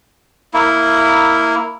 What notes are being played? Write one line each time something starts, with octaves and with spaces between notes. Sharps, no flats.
A#3 E4